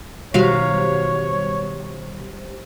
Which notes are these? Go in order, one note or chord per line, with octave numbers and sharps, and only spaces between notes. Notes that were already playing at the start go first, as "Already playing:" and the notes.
B2 D#3 F#3 G3 G4 C5 C#5 F5